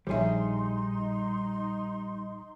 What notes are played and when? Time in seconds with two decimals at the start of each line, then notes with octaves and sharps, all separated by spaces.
0.07 A#1 F3 G3 D#4 G#4 C#5 E5 C6